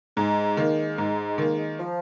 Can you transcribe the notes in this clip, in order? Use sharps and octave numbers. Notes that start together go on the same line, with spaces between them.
G#2 G#3
D#3 A#3
G#2
D#3 A#3
F3